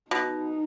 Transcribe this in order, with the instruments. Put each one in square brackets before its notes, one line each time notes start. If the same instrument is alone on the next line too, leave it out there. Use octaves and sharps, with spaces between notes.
[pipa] B2 [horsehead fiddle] D#4